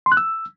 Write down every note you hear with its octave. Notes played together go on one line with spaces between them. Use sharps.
C6
F#6
E6